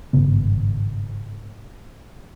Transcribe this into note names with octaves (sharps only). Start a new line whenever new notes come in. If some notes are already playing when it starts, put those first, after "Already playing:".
G#1 G2 C#3 B3